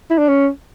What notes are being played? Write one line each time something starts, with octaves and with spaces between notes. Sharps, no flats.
E4
D4
C#4